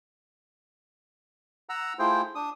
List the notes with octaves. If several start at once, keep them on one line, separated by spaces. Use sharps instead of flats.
F#5 A#5 E6
A3 E4 F4 G#4 C5 G5
D4 D#6